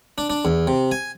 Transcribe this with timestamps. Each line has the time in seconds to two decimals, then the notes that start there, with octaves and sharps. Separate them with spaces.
0.18 D4
0.30 D4
0.45 E2
0.67 C3
0.91 G#5